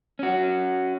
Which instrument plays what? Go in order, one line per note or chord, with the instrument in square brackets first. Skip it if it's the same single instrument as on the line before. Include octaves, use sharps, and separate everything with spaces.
[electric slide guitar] C#4 F#4